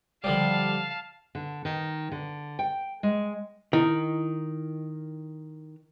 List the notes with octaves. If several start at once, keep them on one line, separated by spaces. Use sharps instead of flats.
D3 F3 G3 F5 A5
D3
D#3
D3
G5
G#3
D#3 E4